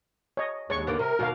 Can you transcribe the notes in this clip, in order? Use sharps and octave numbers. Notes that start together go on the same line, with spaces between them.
C#5 D#5
D#2 G#3 D4 C#5 C#6
D3 A#3 B3
C3 A#4
D#2 B2 A#3 F#4 F5